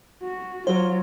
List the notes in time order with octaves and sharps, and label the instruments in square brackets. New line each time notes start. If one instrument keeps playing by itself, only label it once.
[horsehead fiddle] F#4
[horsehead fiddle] F#3 F4 [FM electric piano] C5